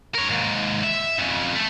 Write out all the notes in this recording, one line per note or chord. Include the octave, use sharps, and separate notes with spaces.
A#4 C#5
D#2 G#2
E5
F2 C#3
A3 A4